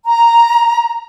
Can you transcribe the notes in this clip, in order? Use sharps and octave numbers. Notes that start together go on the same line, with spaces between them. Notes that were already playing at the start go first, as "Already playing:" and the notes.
A#5